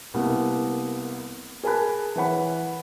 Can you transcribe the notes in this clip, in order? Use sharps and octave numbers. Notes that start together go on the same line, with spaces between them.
C2 A#3 B3
G#4 A#4 G#5 A5 B5 F#6
E3 B4 C#5 F#5 B5